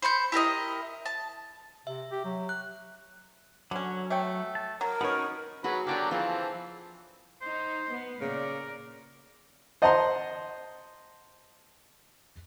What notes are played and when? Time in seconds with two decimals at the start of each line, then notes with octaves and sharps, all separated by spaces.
0.02 C5 B5 C#6 G6
0.32 E4 G4 A#4 D#5
1.06 A5
1.87 C3 E5
2.11 G4
2.25 F#3
2.49 F#6
3.71 D3 F#3 C#4
4.10 A3 C#5 G5
4.55 A5
4.81 F#3 A#4
5.01 B3 C#4 D#4 F#4 C#5
5.64 F#3 F#4 G#4 B4
5.87 D3 F#3 G4 A#4 D5 F5
6.11 E3 F3 C4 G#4 A4
7.41 D#4 C5
7.91 B3
8.21 A#2 C#3 A#4 D5
9.82 C5 D#5 F#5 A5 A#5 C6